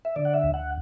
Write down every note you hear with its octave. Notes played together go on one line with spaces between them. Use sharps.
E5
D3 D5
F#5
E5
D2
F#5